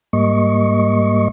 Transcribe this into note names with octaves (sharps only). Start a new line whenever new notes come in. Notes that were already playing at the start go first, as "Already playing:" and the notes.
G#2 G3 A#3 D#5 C#6